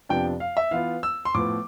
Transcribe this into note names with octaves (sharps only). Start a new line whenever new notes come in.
F2 C3 F3 B3 D4 G5
F5
E5
E3 B3 F4 F5
E6
C6
A2 F3 B3 D6